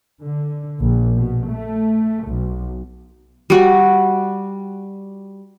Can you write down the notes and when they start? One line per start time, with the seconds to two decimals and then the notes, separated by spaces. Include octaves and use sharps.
0.23 D3
0.80 A#1
1.16 B2
1.50 A3
2.27 B1
3.50 G3 F#4